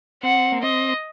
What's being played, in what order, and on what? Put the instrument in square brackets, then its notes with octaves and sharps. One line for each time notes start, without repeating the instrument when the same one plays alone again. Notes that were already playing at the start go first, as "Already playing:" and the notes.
[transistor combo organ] C4 [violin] F#5
[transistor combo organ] A#3
[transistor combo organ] C4 [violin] D#5